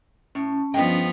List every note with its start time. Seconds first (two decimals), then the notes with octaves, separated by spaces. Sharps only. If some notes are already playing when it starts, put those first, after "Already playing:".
0.35 A2 C#4
0.74 G2 F3 G#3 B3 D#5 G5